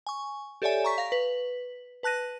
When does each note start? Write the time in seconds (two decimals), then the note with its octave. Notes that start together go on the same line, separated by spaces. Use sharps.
0.07 G#5 C#6
0.62 G4 A4 C#5 D5 E5 G#5
0.84 A#5 C#6 B6
0.98 F5 A#6
1.12 B4
2.03 B4 A5 F#6 A#6 D#7